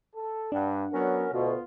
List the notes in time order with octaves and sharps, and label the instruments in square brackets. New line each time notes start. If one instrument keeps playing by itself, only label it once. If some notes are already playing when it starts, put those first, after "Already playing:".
[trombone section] A4
[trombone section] G2 [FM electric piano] D4 F#5
[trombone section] F#3 B3 [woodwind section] C#4 F#4 A#4
[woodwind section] D2 B2 [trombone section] B3 F4